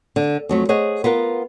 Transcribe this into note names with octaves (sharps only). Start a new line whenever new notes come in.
D3
F2 F#3 A3
G#4 C5 C#5 D#5 F#5
B3 F4 A#4 F#5